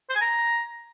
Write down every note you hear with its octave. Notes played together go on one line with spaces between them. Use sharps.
C5
G#5
A#5